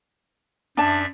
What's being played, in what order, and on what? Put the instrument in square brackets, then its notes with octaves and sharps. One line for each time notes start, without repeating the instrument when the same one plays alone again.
[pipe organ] F#2 D5 E5 [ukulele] D4 A5